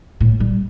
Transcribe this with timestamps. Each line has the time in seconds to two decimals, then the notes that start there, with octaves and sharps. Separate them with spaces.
0.20 A2
0.40 G3